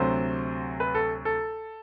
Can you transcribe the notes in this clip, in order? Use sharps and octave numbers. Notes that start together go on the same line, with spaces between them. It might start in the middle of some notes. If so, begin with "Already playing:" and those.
Already playing: D2 C3 F#3 C5
B4
A4
A4